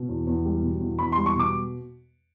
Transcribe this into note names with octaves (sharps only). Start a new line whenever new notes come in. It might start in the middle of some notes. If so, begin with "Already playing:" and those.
Already playing: B2
E2
E2
G3
B2
E2
E2 B5
G3 C6
C#6
B2 D6